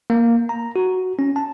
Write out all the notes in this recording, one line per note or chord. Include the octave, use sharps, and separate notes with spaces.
A#3
A#5
F#4
C#4
A5